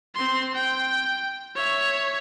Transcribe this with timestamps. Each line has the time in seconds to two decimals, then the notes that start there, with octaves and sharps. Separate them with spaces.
0.15 C4 C6
0.55 G5
1.55 C#5 E5